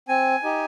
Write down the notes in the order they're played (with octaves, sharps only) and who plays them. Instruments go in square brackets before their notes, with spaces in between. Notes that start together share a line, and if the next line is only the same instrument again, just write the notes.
[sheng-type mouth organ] C4 G#5
D#4 G4